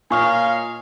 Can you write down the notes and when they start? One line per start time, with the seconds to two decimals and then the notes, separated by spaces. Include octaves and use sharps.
0.11 A#2 C#5 D#5 F5 G#5 C#6 F6